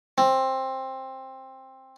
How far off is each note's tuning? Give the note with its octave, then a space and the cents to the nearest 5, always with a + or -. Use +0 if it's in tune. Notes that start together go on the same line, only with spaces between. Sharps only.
C4 +15